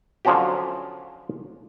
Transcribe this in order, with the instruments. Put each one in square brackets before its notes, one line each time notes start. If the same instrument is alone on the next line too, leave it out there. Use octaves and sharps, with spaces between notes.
[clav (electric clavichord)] D3 F3 F#3 C#4 F#4 G4